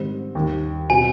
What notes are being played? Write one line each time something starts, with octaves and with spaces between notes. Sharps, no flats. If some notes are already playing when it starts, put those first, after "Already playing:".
Already playing: G#2 D#3 G3 C4
D#2 D#3 G3
B2 G3 C4 F4 G#5